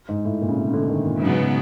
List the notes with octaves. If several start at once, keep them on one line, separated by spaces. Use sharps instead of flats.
G#2
A2
A#2
C#3
C3
C#3
D3
D#3
A#2
G#2 C#3 F#3 B3